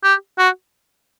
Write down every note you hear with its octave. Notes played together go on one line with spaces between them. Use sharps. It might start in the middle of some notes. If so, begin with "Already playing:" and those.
G4
F#4